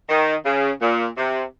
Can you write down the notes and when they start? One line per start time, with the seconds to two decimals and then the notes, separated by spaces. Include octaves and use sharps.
0.09 D#3
0.45 C#3
0.81 A#2
1.17 C3